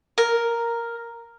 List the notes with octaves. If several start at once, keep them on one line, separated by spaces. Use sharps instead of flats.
A#4